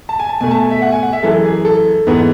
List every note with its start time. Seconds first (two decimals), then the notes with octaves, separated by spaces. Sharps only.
0.09 A5
0.19 G#5
0.29 A5
0.41 B2 A3 G#5
0.51 A5
0.61 G#5
0.71 E5
0.82 F#5
0.92 G#5
1.03 F#5
1.13 E5
1.23 F#2 E3 G#3 A4
1.44 G#4
1.65 A4
2.07 G#2 E3 B3